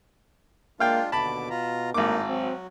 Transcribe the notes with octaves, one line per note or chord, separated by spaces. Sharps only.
G#3 A#3 D4 F4 F5 G5
D#2 B2 D3 A5 B5 D6
F4 A#5
G#1 A2 A#3 D#4 D6
F#3 C4